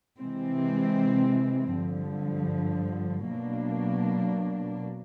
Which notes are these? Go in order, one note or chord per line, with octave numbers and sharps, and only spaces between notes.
C3 E3 G#3 C4
G2 D3 F3
B2 F#3 A#3 D4